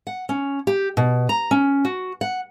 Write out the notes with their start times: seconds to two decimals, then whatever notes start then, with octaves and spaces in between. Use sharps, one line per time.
0.07 F#5
0.29 C#4
0.67 G4
0.97 B2
1.29 A#5
1.51 C#4
1.85 F#4
2.21 F#5